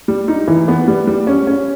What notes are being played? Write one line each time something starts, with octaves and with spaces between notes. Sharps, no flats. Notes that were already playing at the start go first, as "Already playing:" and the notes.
G3
D#4
E3
B3
G3
G3
C#4
C#4